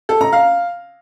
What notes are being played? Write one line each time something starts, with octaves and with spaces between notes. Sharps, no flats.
A4
A#5
F5